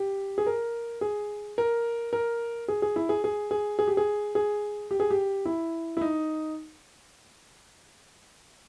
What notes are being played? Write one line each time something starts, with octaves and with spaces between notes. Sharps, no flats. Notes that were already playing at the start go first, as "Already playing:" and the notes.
Already playing: G4
G#4
A#4
G#4
A#4
A#4
G#4
G#4
E4
G#4
G#4
G#4
G#4
G4
G#4
G#4
G4
G#4
G4
E4
E4
D#4